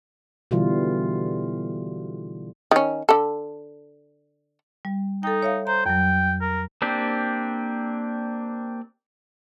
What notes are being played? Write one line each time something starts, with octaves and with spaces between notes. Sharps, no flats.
B2 D3 E3 G3 F4
D#3 C#4
D3 A4
G3
D#4 A4 G5
C#5 E5 F5
C5 A#5
F2 F#3 G5
A#4
A#3 C4 D4 G4